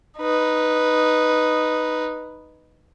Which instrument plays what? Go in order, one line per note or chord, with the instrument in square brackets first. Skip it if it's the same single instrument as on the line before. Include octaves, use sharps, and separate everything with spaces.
[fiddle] D#4 B4